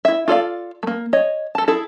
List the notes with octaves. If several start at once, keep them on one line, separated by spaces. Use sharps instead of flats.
E4 E5
F4 A4 D5 F5
A3 A#3
C#5 D#5
A4 A5
E4 G#4 A4